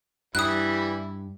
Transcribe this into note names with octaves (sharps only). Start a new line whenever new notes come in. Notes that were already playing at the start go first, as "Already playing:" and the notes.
G2 E3 G3 E4 D#6 F#6